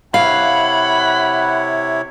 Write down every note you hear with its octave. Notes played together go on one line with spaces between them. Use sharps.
C3 E4 C#5 F5 F#5 B5